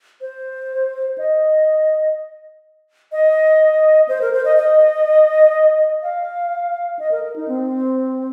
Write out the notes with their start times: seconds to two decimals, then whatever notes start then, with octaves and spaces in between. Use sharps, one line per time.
0.21 C5
1.18 D#5
3.12 D#5
4.09 C5
4.22 A#4
4.33 C5
4.45 D#5
4.57 D#5
6.03 F5
6.99 D#5
7.11 A#4
7.24 A#4
7.36 D#4
7.48 C4